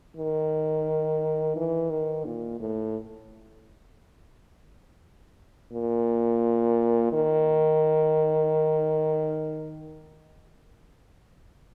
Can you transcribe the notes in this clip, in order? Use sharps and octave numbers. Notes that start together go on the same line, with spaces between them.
D#3
E3
D#3
A#2
A2
A#2
D#3